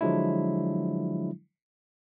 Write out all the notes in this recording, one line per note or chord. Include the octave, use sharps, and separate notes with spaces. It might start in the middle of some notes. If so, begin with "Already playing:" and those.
D3 F3 F#3 G#3 D4 E4